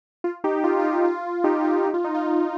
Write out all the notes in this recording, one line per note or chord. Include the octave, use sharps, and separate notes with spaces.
F4
D#4 G4
G4
F4
F4
D#4
F4
D#4 G4
F4
D#4 G4
F4
D#4
F4